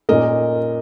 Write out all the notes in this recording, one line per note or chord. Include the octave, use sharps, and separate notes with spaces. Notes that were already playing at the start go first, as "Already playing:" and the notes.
A#2 A#3 C#4 A#4 D#5